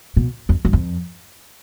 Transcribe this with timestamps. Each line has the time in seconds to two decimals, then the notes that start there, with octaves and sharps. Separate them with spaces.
0.17 B2
0.49 F2
0.65 G2
0.73 F2